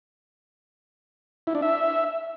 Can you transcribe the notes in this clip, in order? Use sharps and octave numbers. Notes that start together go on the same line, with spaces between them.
E4
D4
E5